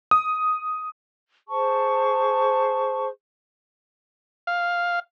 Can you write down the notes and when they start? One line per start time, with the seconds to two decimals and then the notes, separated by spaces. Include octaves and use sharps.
0.11 D#6
1.48 G#4 C5 A5 C#6
4.47 F5